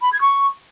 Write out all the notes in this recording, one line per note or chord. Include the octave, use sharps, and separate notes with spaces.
B5
G#6
C#6